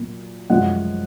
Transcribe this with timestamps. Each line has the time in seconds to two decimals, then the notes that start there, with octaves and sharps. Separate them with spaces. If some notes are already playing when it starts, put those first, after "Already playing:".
Already playing: A#2 F#3
0.50 F#2 F3 G#3 F#5